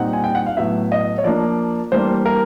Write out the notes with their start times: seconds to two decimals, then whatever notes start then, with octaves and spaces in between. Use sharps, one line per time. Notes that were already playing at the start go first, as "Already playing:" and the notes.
Already playing: A#2 G3 C4 D#4 F#5
0.13 G#5
0.24 G5
0.35 F#5
0.46 F5
0.57 A2 F#3 B3 E5
0.92 D#5
1.18 C#5
1.24 F3 A#3 D4 D5
1.92 E3 G3 A#3 D4 C5
2.26 A#4